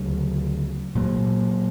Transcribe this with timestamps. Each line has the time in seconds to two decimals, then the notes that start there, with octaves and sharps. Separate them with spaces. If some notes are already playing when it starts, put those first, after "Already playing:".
Already playing: D2 C#3 F#3
0.95 A#2 F#3 A#3